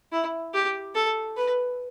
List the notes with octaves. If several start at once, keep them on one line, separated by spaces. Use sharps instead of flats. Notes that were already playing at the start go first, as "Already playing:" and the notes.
E4
G4
A4
B4